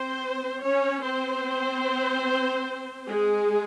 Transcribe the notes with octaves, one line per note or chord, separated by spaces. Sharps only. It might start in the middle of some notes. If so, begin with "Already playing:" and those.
Already playing: C4 C5
C#4 C#5
C4 C5
G#3 G#4